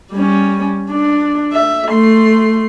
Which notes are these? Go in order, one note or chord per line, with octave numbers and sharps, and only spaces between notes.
G3 C#4
D4
E5
A3 C6